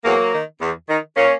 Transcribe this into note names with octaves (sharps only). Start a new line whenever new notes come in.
E2 F#3 A#3
D#3
E2
D#3
A#2 A#3 C#4